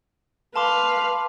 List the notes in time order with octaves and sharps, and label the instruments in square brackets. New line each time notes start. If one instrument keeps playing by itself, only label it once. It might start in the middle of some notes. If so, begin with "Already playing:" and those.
[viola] B4 F5 [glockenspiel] A5 C6 D6